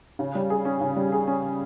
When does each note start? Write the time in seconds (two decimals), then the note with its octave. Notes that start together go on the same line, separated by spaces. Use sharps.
0.19 C#3
0.35 G3
0.50 G#4
0.65 C#4
0.81 C#3
0.96 G3
1.12 G#4
1.27 C#4